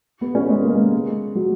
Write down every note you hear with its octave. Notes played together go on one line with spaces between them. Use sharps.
B3
C#4
G#3
A#3
G#3
F#3